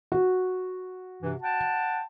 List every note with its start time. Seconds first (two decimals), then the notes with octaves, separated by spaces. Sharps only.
0.12 F#4
1.23 G2 C3 E3
1.42 F#5 G5 A5